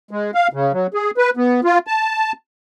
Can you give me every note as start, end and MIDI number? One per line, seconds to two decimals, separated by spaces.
0.11 0.31 56
0.35 0.48 77
0.53 0.72 49
0.72 0.87 54
0.94 1.11 68
1.17 1.30 71
1.37 1.61 59
1.64 1.79 65
1.87 2.32 81